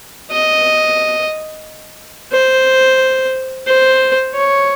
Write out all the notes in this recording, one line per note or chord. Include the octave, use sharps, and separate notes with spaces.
D#5
C5
C5
C#5